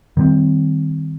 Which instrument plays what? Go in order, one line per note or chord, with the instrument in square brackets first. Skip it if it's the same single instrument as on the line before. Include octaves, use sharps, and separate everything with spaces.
[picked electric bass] D#3 G3 A#3 C4